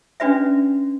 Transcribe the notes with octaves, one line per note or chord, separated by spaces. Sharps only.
C#4 D4 F#4 B4 D5 E5